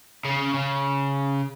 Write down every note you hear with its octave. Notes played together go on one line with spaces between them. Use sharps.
C#3
C#3